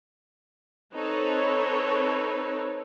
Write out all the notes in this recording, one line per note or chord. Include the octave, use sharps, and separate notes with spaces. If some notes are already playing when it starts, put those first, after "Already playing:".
C4 D#4 A4 B4 C#5